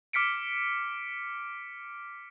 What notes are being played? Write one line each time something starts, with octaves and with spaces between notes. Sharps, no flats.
D6 F6 B6 C#7 D7